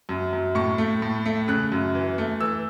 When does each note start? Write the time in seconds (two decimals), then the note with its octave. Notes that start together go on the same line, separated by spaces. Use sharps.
0.09 F#2
0.33 F#2
0.55 A2 C#6
0.78 A3
1.02 A2
1.26 A3
1.48 C#3 F#6
1.72 F#2
1.94 E3
2.18 A3
2.40 E3 E6